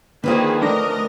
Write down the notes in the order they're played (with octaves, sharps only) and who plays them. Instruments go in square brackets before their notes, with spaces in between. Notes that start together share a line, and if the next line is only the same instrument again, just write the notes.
[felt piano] D3 [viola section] D#3 A#3 G#4 [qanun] F3 C4 B4
[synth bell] A3 D4 A#6 [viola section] A#4 D#5